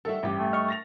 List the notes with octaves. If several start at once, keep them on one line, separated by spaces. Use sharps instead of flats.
D#3 G3 F#4 A4 E5
A1 G2 G4
A3
D#5 C#6 F6
A6 A#6 F7